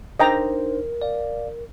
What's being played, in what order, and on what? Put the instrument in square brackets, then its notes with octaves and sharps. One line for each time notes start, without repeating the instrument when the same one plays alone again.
[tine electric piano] D4 D#4 C5 [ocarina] A#4 [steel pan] D#5 G5 A#5
[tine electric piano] D5 F5